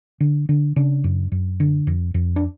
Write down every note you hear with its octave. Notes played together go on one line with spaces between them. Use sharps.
D3
D3
C#3 D4
F#2
F#2
D3
F2
F2
D4